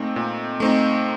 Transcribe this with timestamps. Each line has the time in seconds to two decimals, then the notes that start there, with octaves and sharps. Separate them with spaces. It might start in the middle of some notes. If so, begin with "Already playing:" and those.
Already playing: A#2 A3 C4 D#4
0.16 A#2
0.60 A3 C4 D#4